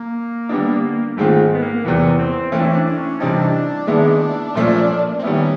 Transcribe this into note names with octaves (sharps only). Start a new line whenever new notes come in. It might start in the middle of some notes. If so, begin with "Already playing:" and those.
Already playing: A#3
D3 G3 B3 D4
G#2 D#3 G#3 A3 C4 F4
B3
A#3
E2 C3 E3 B3
C4
E3 A3 C4 C#4 E4
D4
C#4
D4
D4
C#4
C3 E3 G3 C4 D4 D#4
D#3 G#3 B3 E4
A#2 F3 A3 C#4 F4
C4
D#3 G3 B3 C#4 E4